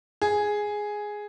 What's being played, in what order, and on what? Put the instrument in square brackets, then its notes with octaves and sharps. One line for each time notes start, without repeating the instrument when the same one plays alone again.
[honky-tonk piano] G#4